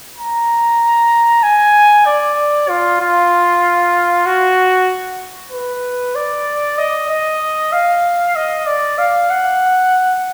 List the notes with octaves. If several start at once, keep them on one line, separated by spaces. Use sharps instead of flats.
A#5
G#5
D5
F4
F4
F#4
B4
D5
D#5
D#5
F5
D#5
D5
F5
F#5